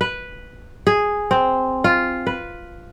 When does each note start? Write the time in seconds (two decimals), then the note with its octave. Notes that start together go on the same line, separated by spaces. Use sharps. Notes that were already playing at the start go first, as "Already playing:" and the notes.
0.01 B4
0.87 G#4
1.31 C4
1.84 F4
2.27 B4